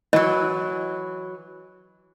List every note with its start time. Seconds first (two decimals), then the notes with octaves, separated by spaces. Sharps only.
0.13 E3 F#3 D#5